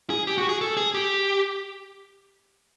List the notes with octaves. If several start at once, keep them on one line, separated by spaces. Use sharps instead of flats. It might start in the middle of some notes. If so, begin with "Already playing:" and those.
G#4
G4
F#4
G#4
A4
G#4
G4